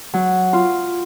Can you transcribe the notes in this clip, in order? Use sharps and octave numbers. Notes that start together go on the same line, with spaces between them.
F#3
F4